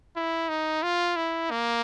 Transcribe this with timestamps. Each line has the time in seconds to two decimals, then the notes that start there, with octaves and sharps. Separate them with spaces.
0.16 E4
0.49 D#4
0.83 F4
1.16 E4
1.51 A#3